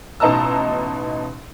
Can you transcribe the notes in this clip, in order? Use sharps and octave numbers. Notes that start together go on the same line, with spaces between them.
A1 B2 D#4 A5 A#5 E6